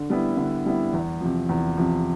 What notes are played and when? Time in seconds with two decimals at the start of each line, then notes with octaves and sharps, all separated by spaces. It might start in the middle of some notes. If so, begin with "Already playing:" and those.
Already playing: D3
0.10 G3 B3 E4
0.37 D3
0.66 G3 B3 E4
0.93 E2
1.21 C3 F3
1.49 E2
1.77 C3 F3